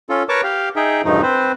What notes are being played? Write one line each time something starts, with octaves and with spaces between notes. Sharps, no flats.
C#4 F4 A4
A#4 B4 C#5 A5 C#6 D6
G4 F5
D#4 G#4 E5 G5
E2 G2 B2 F3 A3 D#4
C4 B4 C5